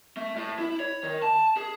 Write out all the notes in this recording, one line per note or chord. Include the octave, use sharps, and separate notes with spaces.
A3
A2
E4
C#5
D#3
A5
G#4